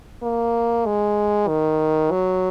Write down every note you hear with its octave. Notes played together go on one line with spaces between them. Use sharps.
A#3
G#3
D#3
F#3